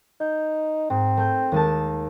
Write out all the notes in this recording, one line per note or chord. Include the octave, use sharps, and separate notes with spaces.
D#4 G6
G#2 C4
A3 G6
D#2 G#3 A5